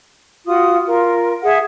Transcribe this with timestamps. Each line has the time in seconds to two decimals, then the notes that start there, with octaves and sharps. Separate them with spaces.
0.47 F4 F#4 D#6
0.86 F4 A#4
1.43 G#4 E5 F#5